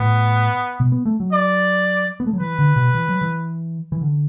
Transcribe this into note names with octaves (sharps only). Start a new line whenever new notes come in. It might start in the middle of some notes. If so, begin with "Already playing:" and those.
Already playing: A2 B3
B2
B3
A3
F#3
D5
B3
A3
F#3
E3 B4
D3
B2
E3
F#3
E3
E3
D3